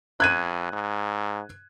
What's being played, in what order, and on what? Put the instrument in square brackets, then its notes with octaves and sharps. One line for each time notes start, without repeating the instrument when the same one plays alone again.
[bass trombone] F2 [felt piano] F#6 G#6 D#7
[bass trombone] G#2